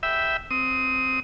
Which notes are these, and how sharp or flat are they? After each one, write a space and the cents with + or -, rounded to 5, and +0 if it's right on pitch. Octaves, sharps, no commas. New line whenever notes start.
E5 -5 G5 +0 B5 +0
C4 +0 D#6 +15